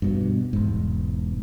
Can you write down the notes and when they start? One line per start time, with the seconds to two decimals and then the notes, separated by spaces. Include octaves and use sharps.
0.02 G2 B2
0.53 E1 G#2